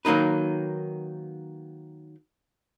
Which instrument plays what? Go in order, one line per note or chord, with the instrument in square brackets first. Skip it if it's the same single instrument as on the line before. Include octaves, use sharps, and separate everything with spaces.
[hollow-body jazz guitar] D#3 F#3 A#3 D#4 B4